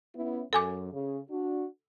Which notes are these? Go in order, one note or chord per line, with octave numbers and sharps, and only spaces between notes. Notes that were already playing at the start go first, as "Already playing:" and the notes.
B3 C#4 E4
F#2 A4 G#5 D6
C#3
D4 F#4